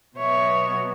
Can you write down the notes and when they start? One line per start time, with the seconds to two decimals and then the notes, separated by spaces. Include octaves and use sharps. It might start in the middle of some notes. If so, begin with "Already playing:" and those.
0.17 B2 F#3 B3 C#5 E5